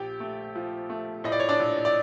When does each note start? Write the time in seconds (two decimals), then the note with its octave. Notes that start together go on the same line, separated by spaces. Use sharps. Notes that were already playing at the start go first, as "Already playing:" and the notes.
Already playing: A#1 G4 G5
0.20 A3
0.55 F3
0.90 A3
1.24 A2 D#5
1.32 D5
1.40 C#5
1.49 D4 D5
1.60 A#1
1.85 D5